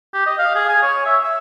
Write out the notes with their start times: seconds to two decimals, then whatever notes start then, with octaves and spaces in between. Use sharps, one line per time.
0.13 G4
0.26 D#5
0.39 F5
0.55 G#4
0.68 G#5
0.82 C#5
1.06 E5
1.24 E6